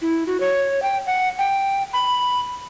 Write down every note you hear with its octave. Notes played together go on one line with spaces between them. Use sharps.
E4
F#4
C#5
G5
F#5
G5
B5